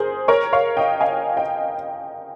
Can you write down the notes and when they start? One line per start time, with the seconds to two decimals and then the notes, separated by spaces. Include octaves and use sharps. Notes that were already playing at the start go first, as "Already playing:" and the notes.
Already playing: G#4 A#4 C5
0.28 A#4 C#5
0.53 C#5 F5
0.77 D#5 G5
1.01 F5 G#5
1.37 D#5 G5